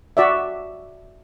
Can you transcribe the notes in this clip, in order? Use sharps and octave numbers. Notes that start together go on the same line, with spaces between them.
F#4 D5 E5